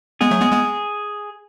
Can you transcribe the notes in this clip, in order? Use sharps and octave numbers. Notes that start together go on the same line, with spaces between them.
G#3 B3 G#4
F#3 A3
G#3 B3
G#3 B3